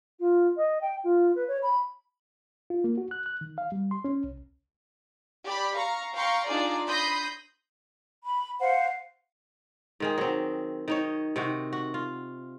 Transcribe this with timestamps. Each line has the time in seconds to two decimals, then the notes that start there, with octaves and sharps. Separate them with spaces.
0.19 F4
0.56 D#5
0.81 G5
1.03 F4
1.35 B4
1.47 C#5
1.62 B5
2.70 F4
2.84 A#3
2.98 F#4
3.11 F#6
3.26 F#6
3.41 D#3
3.58 F5
3.72 G3
3.91 C6
4.05 C#4
4.24 C2
5.44 G4 D5 B5
5.76 F5 A#5 C#6
6.15 F5 G5 A#5 C6 C#6
6.47 D4 D#4 F4 G#4 D5
6.88 B5 C6 D#6 G6 A#6
8.23 B5
8.60 C5 F5 F#5
10.00 G#2 D#3 G#4
10.18 F#3 C4
10.88 D#3 D#4 C#5
11.36 C3 D#3 F#4
11.73 F#4
11.94 F4